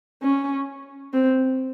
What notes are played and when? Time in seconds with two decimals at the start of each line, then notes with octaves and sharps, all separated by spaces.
0.22 C#4
1.13 C4